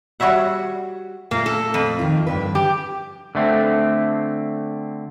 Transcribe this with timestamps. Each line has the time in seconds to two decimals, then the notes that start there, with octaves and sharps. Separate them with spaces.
0.20 G3 F#4 C#5 E5 F#5
1.31 A#2 A3 A#3
1.46 A4
1.74 F2
1.99 D#3 F4
2.27 G2 D3 B4
2.55 G4
3.35 D3 A3 C4